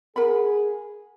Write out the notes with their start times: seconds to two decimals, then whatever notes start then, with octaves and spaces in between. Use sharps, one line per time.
0.16 G#4 A#4 F#5 B5